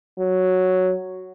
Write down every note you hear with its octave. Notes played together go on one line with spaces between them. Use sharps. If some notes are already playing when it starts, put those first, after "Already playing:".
F#3